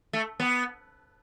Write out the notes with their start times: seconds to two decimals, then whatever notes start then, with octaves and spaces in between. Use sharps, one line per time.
0.13 A3
0.40 B3